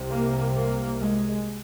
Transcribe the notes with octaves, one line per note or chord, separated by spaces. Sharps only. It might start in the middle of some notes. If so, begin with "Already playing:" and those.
Already playing: C2 C3
A#3
A#3
G#3